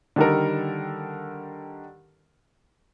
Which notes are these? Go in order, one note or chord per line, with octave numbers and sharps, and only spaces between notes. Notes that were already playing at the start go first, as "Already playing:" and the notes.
D3 D#3 G3 D#4 A4 A#4